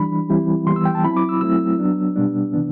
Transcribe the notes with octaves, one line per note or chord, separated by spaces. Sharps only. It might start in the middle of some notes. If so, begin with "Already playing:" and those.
Already playing: E3 G3 D4 B5
E3 G3 C4 E4
E3 G3 B3 C6
E6
G5
A5
F#3 C4 E4 B5
D6
E6
F#3 A3 C4 E4 E6
F#3 B3 D4
B2 G3 B3 D4
C3 E3 B3 D4